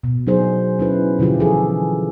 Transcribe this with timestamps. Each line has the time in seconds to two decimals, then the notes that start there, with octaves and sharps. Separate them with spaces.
0.03 B2
0.27 F#3 D4 D#4 G#4 C5
0.79 C#4 E4 B4
1.19 B2 D3 F3 E4 F4 G4
1.39 E3 G#4 A4